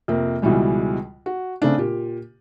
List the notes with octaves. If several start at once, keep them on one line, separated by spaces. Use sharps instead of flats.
F2 C3 A#3
C#2 B2 E3 G3 G#3
F#4
C#3 A3 C4 D4
A#2 G4